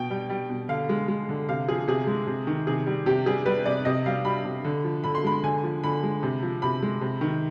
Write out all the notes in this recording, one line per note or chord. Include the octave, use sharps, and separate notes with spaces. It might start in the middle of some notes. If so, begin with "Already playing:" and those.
Already playing: B2 G5
G3
G3
B2
D3 F5
G#3
G#3
D3
C3 F5
F3 G#4
C3 G#4
G#3
C3
D#3
C3 G#4
G3
C3 G4
G3 G#4
G3 B4
C3 D5
C3 D#5
G3 F5
G3 B5
C3
D3
F3
D3 B5
C6
G#3 B5
D3 G#5
F3
D3 B5
G#3
C3
F3
C3 B5
G#3
C3
D#3